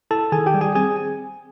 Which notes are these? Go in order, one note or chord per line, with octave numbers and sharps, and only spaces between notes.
E4 A4 A5
D#3 G#4 G#5
G4 G5
G3
G#4 G#5
C4 G#4 G#5